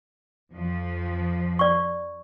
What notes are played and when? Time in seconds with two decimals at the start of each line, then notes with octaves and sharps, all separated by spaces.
0.51 F2 F3
1.59 D5 C#6